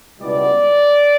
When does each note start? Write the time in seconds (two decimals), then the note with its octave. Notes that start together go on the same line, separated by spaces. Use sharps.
0.20 C#2 B2 G3 B3 E4 D5